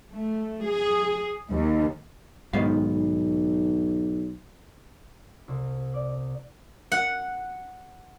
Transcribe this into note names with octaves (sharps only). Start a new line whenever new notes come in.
A3
G#4
D#2
B1 G#2 D#3 B3 F5
C2
D5
F#5